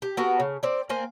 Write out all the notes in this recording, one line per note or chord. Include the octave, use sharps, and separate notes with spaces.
G4
B3 F#4 A4 A#4
C#3
C4 D5
A#3 C4 G#5